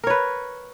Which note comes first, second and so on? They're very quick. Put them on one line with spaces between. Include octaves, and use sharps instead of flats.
A#4 C#5 B4